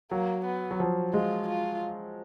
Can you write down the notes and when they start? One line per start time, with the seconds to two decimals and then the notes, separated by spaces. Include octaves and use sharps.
0.11 F#3 A#3
0.45 B3
0.71 F#3
0.80 F3
1.14 G#3 F4
1.49 F4